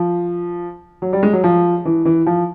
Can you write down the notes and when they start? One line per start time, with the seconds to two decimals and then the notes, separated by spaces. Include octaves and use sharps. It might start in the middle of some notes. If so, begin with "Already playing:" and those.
Already playing: F3
1.02 F#3
1.13 G3
1.23 G#3
1.33 F#3
1.44 F3
1.85 E3
2.05 E3
2.26 F3